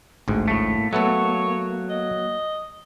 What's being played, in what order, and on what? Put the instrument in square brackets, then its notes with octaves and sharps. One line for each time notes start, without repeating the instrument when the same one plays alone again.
[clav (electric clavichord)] A1 D2 G#2 [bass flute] A#3
[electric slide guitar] A2 A3
[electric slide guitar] F#3 [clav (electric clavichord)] A3 B3 A4 [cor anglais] C#5
[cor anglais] D#5